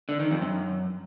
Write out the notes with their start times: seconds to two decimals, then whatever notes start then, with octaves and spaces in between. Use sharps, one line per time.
0.09 D3
0.20 D#3
0.31 F2
0.42 F#2